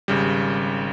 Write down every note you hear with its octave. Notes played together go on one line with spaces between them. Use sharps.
G#1 C#3 G3